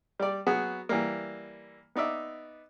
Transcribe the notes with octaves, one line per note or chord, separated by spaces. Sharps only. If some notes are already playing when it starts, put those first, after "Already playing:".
G3 D5
F#3 B3 F#4 G#4
E3 G3 A#3
B3 D#4 D5 E5